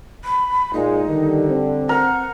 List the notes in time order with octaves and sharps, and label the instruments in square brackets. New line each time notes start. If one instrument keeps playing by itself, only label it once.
[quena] B5
[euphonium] A#2 [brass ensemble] G#3 [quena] D#4
[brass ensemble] D3 G3 [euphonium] D#3
[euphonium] C4
[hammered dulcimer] A#4 [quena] F#5